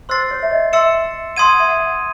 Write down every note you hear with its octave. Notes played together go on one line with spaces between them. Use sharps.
C5 C6 E6 A6 C7
C#5
E5
D#5
E5 C6 E6 A6 C#7 E7
F#5 C6 D#6 G#6 D#7
E5
F#5